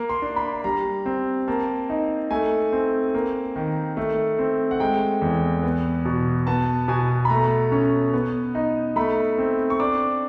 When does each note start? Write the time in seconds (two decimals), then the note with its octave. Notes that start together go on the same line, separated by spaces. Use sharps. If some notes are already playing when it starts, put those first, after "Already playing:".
Already playing: A#3
0.10 C6
0.22 D4
0.36 B5
0.64 G3 A#5
1.06 C4
1.48 A#3 A5
1.90 D#4
2.31 A3 G#5
2.72 C4
3.14 A#3
3.56 D#3
3.97 A3
4.39 C4
4.71 F#5
4.80 G#3 G5
5.21 E2
5.63 B3
6.05 B2
6.47 B3 A5
6.88 B2 G#5
7.25 B5
7.29 A3 A#5
7.72 C#4
8.14 B3
8.55 D#4
8.96 A3 B5
9.38 C4
9.70 C#6
9.80 D4 D6